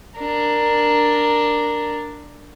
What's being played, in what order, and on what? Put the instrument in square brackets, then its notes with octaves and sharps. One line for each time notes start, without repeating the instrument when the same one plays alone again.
[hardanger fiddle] D4 A#4